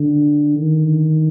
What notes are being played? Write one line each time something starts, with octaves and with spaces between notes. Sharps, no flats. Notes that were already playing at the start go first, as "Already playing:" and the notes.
Already playing: D3
D#3